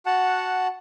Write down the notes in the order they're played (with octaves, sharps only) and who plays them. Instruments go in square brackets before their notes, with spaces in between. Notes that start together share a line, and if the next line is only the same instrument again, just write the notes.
[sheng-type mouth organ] F#4 F#5 A5